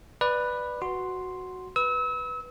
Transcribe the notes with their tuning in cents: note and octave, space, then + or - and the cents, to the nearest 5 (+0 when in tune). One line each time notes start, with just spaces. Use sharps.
B4 +0 D5 +20
F#4 +0 C6 +0
B4 +0 E6 -35